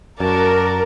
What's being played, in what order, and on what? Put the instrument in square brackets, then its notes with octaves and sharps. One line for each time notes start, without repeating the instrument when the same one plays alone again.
[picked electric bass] F#2 [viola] F#4 A5 [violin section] A#4 [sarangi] D5